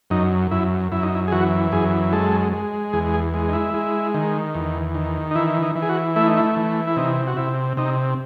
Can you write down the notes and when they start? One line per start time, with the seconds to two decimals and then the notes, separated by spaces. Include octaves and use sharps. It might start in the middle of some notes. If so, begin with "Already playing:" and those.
0.10 F#2 D#4
0.51 F#2 E4
0.92 F#2 E4
1.03 D#4
1.15 E4
1.28 G#4
1.32 E3 F#4
1.72 F#2 G#4
2.12 G#3 A4
2.53 G#3
2.93 E2 G#4
3.14 G#4
3.34 G#3
3.48 D#4
3.53 E4
3.74 G#3
4.14 D#3
4.55 E2
4.95 D#3
5.31 D#4
5.35 E3 E4
5.63 D#4
5.75 E3
5.82 G#4
5.89 F#4
6.16 A3 E4
6.27 D#4
6.37 E4
6.56 E3
6.87 E4
6.96 C3 D#4
7.27 F#4
7.37 C3 E4
7.77 C3 D#4